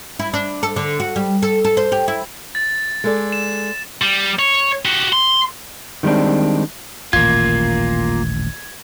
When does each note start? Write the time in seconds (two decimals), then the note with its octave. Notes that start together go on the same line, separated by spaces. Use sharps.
0.19 E4
0.34 D4
0.63 A4
0.76 D3
1.00 F#4
1.16 G3
1.42 A4
1.64 A4
1.77 C5
1.92 G4
2.08 E4
2.55 A6
3.04 G#3 A4 D5
3.32 E7
4.02 G3
4.39 C#5
4.85 F#4 G4
5.13 C6
6.03 D#3 G3 G#3 C4 D4
7.13 D#1 A1 A#3 F4 G#6